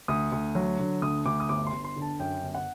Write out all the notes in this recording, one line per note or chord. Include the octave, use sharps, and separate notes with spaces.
D2 D#6
D2
F#3
D3
D2 D#6
D2 D6
D#6
G1 D6
C6
G1
C6
D3
A5
F#2 G5
G1
F#5